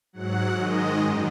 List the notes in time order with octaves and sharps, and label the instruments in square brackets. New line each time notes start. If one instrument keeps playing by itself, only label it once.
[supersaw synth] G#2 F#3 F#5
G#2 D#3 G#3 D#5
F#2 D#3